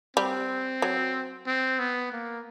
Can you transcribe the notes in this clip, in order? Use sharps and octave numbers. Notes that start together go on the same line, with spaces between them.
G3 C4
F#3
C4
B3
A#3